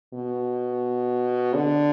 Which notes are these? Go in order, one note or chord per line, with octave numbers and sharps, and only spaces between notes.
B2
D3